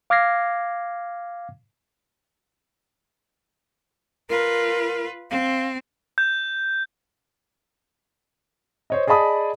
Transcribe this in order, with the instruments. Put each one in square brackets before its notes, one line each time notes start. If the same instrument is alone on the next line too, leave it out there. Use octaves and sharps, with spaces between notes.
[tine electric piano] F5 D6 F6 G#6 A#6 C7
[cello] F4 B4 [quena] A#4
[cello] C4 [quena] F5
[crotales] G6
[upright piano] C5 C#5 D#5
G#4 D5 D#5 A5 B5 D#6